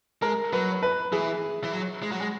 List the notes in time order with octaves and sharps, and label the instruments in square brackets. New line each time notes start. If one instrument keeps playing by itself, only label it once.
[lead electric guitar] G#3 [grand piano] A#4
[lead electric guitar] F#3 [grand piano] B4
[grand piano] B4
[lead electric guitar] E3 [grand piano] G#4
[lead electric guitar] E3
F#3
G#3
F#3
G#3